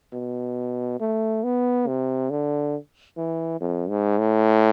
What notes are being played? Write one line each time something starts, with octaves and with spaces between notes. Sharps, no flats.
B2
A3
B3
C3
D3
E3
F2
G#2
A2